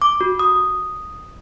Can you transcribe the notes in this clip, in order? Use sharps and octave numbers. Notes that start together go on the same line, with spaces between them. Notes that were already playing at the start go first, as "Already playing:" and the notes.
D6
F#4
D#6